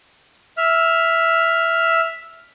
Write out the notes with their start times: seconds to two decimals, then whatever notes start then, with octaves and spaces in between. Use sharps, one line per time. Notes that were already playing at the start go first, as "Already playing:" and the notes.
0.58 E5 F6